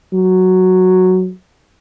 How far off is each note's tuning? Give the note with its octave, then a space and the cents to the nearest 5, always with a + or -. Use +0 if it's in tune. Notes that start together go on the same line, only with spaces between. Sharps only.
F#3 +0